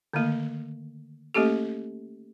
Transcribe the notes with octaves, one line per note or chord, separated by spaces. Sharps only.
D3 D#3 A3 A#3
A3 A#3 C#4 G4 A4